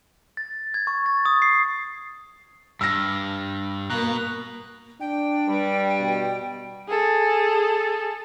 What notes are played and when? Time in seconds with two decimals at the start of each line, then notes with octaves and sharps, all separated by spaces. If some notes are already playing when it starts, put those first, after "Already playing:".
0.37 A6
0.74 G#6
0.87 C#6
1.06 A6
1.26 D#6
1.42 C7
2.81 G2 E6 F6 A#6
3.90 B2 A#3 A#5 F#6
5.00 D4 G5
5.48 G2 G3
6.00 B2
6.88 G#4 A4